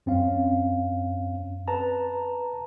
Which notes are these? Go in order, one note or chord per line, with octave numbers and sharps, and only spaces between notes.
F#2 C4 C#4 F5
B4 A5 A#5